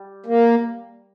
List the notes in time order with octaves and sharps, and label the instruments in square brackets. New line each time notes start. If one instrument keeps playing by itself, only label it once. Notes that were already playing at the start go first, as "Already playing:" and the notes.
Already playing: [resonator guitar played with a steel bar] G3
[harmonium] A#3